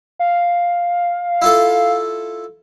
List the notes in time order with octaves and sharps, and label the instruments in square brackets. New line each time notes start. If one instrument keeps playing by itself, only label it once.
[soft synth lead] F5
[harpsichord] E4 F4 A4